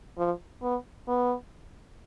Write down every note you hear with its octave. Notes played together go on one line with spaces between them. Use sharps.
F3
B3
B3